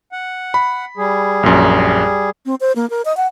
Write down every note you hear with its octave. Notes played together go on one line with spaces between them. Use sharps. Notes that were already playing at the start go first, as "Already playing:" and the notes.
F#5
B5
G3 G#4
A#1 F#2
C4
C5
A#3
A#4
D#5
F#5